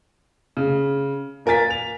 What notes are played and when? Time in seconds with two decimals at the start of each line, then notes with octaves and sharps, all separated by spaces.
0.57 C#3
1.46 A#2 A#4 G#5 A6 B6
1.70 F7